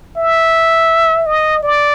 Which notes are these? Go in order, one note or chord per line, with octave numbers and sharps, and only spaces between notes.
E5
D#5
D5